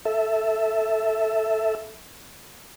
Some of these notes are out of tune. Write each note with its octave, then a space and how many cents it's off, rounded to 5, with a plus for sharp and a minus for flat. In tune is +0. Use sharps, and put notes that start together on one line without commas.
A4 +0 E5 +0